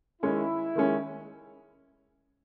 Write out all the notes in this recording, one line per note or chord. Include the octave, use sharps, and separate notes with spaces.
D#3 G#3 C#4 E4
D#3 G#3 C#4